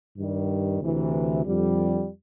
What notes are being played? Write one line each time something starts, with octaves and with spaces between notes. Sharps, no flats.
G2 D#3 G3
D2 C3 E3
F2 D3 G3